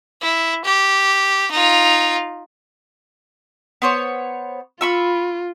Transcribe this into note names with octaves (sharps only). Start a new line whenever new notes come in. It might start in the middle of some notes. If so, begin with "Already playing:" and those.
E4
G4
D#4 F4
B3 C5 C#5
F4 B5 C#6 E6